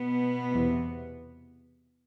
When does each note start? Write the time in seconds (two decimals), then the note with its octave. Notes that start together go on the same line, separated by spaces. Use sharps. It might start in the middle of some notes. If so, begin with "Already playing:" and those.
Already playing: B2 B3
0.52 E2 C3 E3